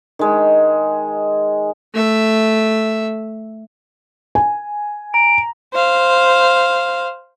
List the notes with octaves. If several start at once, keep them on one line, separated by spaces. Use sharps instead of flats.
D#3 G#3
A3 E5
G#5
A#5 D7
C5 F5